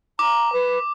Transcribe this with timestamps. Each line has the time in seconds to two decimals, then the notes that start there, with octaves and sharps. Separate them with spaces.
0.19 A#5 D6
0.52 B4